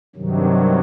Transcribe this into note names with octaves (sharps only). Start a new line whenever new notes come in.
G2 C3 D#3 F#3